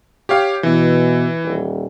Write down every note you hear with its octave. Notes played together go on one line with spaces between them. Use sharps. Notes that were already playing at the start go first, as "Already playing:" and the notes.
G4 C#5 F5
B2 E3
D#1